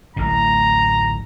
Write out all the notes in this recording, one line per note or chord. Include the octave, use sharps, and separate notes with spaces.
D1 A1 A2 A#5